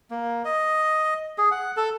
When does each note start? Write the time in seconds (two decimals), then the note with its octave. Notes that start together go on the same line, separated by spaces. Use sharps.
0.10 A#3
0.45 D#5
1.38 G#4
1.51 F#5
1.77 A4